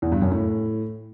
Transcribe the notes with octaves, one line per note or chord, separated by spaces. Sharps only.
E2
G2
F#2
A2